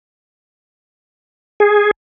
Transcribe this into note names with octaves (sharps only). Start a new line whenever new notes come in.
G#4